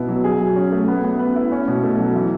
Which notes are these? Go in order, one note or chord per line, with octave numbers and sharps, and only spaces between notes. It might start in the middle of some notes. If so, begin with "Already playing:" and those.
Already playing: B2 B3 E4
F#3
G#4
F#3
C#4
A3
B3
B3
B4
E4
C#4
B2
A3
F#3
E3